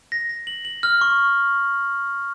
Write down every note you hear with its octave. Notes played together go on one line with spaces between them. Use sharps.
A#6
A#6
F#7
F#7
F6
C#6